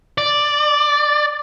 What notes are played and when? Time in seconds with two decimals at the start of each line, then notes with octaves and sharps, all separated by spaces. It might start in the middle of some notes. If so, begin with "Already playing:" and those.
0.18 D5